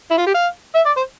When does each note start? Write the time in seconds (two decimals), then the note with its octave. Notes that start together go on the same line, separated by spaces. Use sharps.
0.11 E4
0.18 F4
0.27 G4
0.34 F5
0.75 E5
0.86 D5
0.97 C5